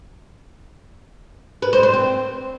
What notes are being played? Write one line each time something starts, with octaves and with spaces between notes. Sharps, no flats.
B4
C5
C5
C4